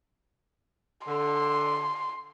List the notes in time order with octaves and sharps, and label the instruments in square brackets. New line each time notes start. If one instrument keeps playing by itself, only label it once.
[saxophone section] D3 [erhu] C6